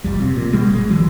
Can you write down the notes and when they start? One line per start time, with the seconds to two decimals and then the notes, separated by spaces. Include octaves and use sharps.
0.04 F1 F2 G3
0.20 C3
0.36 A#2
0.53 B2 G3 G#3
0.71 G1 G#3
0.89 D3 E3 F#3